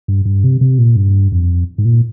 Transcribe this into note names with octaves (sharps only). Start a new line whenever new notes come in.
G2
G2
C3
C3
A#2
G2
F2
G#2
A#2